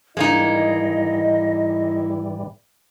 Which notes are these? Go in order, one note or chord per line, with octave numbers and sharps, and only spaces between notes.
G#2 E3 G3 G#3 A#3 D#4 E4 D#5